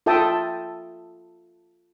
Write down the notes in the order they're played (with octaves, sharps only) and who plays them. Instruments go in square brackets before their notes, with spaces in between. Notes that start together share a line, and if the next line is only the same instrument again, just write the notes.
[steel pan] F4 A4 E5 G5 A5 D#6